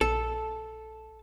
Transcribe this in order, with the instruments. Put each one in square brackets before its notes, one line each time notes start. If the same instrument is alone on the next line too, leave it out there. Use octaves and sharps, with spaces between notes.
[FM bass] A#1 [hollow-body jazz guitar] A4